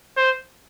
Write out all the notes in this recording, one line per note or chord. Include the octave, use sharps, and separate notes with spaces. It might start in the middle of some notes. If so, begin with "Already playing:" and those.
C5